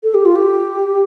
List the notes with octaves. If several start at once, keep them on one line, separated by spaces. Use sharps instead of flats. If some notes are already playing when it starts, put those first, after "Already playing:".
A4
G4
F4
G4